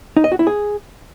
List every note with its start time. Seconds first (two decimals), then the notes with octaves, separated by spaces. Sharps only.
0.17 D#4
0.24 D#5
0.32 F#4
0.39 E4
0.47 G#4